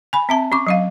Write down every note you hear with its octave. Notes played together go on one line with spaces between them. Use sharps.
G#5 B5
C4 E5 A5
C#4 C#6 D6
F#3 D#5 F5